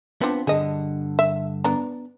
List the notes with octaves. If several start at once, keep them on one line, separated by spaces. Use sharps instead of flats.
F3 B3 C4 D4
G2 D3 G#4 D#5
E5
B3 D4 A#5